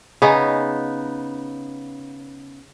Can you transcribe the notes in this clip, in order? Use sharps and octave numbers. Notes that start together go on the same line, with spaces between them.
C#3 B3 D#4